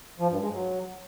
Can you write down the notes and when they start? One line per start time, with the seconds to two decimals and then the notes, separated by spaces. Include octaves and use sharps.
0.19 F3
0.31 G2
0.42 G#3
0.53 F#3